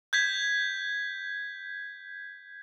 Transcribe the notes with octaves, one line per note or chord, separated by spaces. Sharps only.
G6 G#6 B6